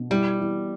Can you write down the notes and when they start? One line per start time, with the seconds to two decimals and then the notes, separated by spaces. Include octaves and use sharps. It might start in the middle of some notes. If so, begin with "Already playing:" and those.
Already playing: B2
0.10 G3 E4
0.40 E3